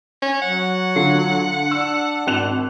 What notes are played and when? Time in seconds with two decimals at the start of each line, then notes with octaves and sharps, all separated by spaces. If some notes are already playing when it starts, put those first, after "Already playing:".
0.22 C#4
0.42 F#3 F#5
0.96 D3 F4 C7
1.71 D4 E6 C#7
2.27 G#1 F#6 F7